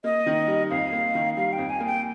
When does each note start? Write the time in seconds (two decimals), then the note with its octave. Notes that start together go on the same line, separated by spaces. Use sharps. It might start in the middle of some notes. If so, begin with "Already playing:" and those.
0.04 A#3 D#5
0.26 D#3
0.48 G3
0.70 F2 F5
0.92 A#3
1.15 D#3
1.36 G3 F5
1.53 F2 G5
1.70 G#5
1.80 A#3
1.86 G5